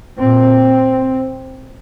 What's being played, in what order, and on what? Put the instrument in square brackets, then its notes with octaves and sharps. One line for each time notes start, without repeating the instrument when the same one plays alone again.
[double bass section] A#2 C4